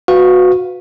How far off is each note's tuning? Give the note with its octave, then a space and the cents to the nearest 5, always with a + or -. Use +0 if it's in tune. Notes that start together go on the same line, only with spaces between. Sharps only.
F#4 -15 B4 +15 F5 +0